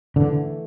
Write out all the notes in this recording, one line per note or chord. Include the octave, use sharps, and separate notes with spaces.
D3 E3 A3